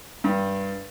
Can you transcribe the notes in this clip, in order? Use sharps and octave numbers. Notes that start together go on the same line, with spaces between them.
G2